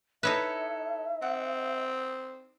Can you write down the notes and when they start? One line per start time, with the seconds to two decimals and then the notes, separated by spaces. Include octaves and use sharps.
0.23 D#4 E4 A4 B4 C#5 E5 F#6
1.22 C4 F#5